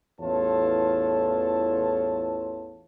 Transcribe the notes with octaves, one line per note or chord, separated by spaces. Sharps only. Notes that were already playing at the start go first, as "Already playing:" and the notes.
A1 E2 F4 A4 C#5 A5